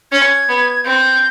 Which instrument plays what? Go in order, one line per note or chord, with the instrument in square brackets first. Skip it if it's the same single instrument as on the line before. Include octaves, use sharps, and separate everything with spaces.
[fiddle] C#4 [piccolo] G#6
[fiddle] B3
[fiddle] C4 [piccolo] G6